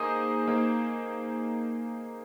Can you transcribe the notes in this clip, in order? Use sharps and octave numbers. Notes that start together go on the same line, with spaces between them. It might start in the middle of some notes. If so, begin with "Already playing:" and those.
Already playing: A#3 D#4 G#4 C5 D#6
A#3 D#4 G#4 C5